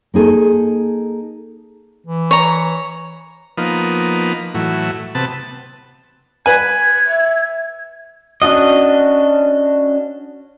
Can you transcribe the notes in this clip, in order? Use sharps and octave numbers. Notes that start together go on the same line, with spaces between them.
A#3 D#4 G#4 A4
E3
C#5 A#5
F3 A#3 B3 D#4
A2 E3 F#3
C3 B3 A5
B4 G#5 G#6
E5
C#4 D4 F#4 D#5